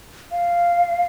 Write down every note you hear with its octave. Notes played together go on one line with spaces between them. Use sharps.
F5